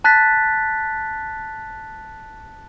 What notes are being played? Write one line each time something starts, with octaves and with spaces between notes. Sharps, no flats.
A5 F#6 A6 B6